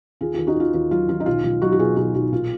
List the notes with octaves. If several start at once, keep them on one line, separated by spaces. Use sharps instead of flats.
D#2 F4 G#4
D#2 F4 G#4
D#4 F#4
D#2 F4
D#2 F4
F#3 F4
D#2 F4
D#4
B1 F4
B1 F4
F#3 D#4 F#4
F#4
B2 F4 G#4
B2 D#4 F#4
B1 D#4 F#4
A#2 F4